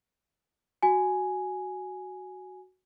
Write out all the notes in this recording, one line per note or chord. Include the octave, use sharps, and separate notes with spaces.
F#4 G#5